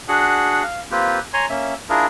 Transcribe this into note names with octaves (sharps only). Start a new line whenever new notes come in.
D4 F#4 G#4 F#5
F5
A#3 C4 F4 G4 B4
C#5 G#5 A#5 C6
A#3 C#4 E5
D4 E4 F4 G#4 A#4